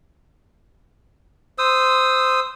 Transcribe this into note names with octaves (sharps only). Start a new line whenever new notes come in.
C5 D#6 E6